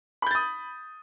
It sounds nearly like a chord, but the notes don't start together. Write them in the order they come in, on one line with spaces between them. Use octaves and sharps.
B5 G6 A6 D#6